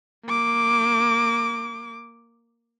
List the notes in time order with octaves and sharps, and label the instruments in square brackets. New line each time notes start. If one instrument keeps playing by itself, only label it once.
[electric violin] A#3 D6